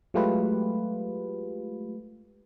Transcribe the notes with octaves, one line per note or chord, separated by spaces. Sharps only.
F#3 G#3 A3 F4 G4 B4